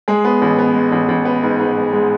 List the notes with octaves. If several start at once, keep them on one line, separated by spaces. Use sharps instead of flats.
G#3 G#4
B3
A1
B3
G#3
A1
A1
B3
G#2
G#2
G#3
G#3